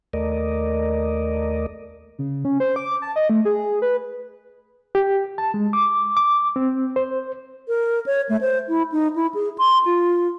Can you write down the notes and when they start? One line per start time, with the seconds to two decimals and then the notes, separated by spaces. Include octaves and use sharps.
0.13 D#2 A3 A#4 D5 D#5
2.19 C#3
2.45 C#4
2.60 C5
2.76 D6
3.02 A5
3.16 D#5
3.30 A3
3.45 G#4
3.82 B4
4.95 G4
5.38 A5
5.54 G#3
5.73 D6
6.17 D6
6.56 C4
6.96 C5
7.68 A#4
8.06 C#5
8.29 A3
8.41 C5
8.69 E4
8.92 D#4
9.16 E4
9.34 G#4
9.58 C6
9.86 F4